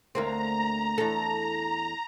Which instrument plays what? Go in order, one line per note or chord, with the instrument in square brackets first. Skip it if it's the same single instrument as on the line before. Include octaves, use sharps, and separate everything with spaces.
[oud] D2 A#3 C4 [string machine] A#5
[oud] E2 A4